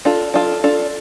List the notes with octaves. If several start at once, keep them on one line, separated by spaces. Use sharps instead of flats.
D4 F4 A4
D4 F4 A4
D4 F4 A4